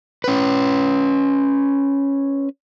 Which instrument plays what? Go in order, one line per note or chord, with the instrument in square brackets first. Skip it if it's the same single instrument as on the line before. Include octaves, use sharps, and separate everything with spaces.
[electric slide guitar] C#4 B4